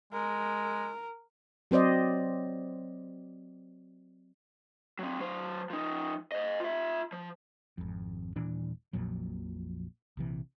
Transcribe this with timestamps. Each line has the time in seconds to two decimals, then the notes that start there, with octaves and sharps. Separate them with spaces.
0.13 G#3 A#4
1.71 F#3 C4 C5 D5 D#5
4.99 F#3 C4
5.19 F#3 C5
5.70 F3 D#4
6.32 C5 D#5
6.60 F4 E5
7.13 F3
7.78 G#1 F2
8.36 D#1 A#2 E3 D4
8.93 A#1 F2 A#2 F#3
10.17 A#1 C3 E3